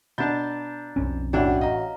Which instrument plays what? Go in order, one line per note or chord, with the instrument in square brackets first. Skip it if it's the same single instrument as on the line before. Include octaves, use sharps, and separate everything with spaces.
[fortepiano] B2 D4 A5 [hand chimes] A#5 A6 [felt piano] G6
[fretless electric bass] B1 F2 C#4
[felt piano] A1 F#4 E5 [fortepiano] E3 D4 E4 [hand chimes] F#5 G5
[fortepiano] D#5 [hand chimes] F5 A#5